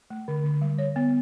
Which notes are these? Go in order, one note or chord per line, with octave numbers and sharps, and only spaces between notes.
A3
D3
D3
G3
C#5
B3